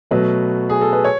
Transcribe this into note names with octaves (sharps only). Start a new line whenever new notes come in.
B2 F#3 A3 B4
G#4
A4
B4
C#5